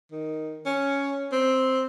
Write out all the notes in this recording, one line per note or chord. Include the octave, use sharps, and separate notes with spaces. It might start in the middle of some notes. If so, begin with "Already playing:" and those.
D#3
C#4
C4